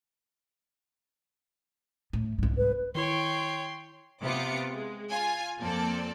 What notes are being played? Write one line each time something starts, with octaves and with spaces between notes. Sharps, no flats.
A2
C2 G#2
B4
D#3 E4 C#5 G5 C6
C3 B3 F4 D6 C#7
G#3
F4 G#5
F2 A#3 C4 A4 D5